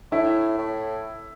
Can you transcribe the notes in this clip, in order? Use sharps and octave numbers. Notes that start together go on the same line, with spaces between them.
A2 E4
A2